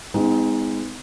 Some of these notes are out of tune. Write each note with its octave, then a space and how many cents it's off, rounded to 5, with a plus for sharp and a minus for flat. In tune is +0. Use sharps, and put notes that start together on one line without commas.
G#3 -20 B3 +45 D#4 +20